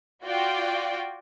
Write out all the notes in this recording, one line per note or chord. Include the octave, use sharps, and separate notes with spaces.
F4 F#4 D5 G5